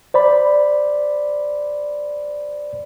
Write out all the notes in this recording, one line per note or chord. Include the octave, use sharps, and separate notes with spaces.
C5 D5 B5